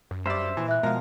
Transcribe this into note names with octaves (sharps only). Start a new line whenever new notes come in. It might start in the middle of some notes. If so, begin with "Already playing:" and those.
F#2
G2 C5 D5 E5
A#2 E3
E5 F#6
B2 F3 G#3 A#4 F5